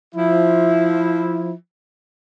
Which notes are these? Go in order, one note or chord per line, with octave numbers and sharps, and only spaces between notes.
F3 E4